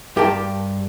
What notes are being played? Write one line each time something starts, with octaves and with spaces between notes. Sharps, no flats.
G2 G4 A#4 G5 A5